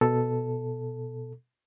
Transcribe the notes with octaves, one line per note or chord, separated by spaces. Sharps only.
B2 A4